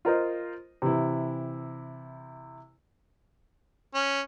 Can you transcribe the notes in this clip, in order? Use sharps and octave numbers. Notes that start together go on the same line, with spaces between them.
F4 A#4 C5 D#5
C3 E3 E4
C#4